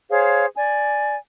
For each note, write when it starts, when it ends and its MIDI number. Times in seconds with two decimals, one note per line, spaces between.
0.10 0.46 68
0.10 0.46 72
0.10 0.46 73
0.10 0.46 77
0.56 1.16 74
0.56 1.16 80